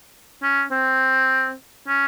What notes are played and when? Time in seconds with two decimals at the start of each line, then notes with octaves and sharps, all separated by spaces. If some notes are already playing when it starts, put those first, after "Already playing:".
0.43 C#4
0.71 C4
1.88 C#4